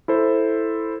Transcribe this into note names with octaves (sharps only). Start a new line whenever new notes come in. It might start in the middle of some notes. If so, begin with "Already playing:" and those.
E4 A4 C5